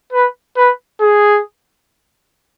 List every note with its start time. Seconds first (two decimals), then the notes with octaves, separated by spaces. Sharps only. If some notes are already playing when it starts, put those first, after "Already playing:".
0.13 B4
0.57 B4
1.01 G#4